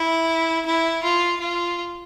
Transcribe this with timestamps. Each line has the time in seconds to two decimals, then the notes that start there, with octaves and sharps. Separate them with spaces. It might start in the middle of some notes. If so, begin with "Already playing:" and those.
Already playing: E4
0.66 E4
1.03 F4
1.41 F4